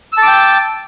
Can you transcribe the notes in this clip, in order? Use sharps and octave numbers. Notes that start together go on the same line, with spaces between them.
G5 A5 D6 E6